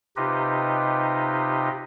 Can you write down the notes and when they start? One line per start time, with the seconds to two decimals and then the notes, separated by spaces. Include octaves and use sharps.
0.16 C3 D#4 F4 G4 B4 D#5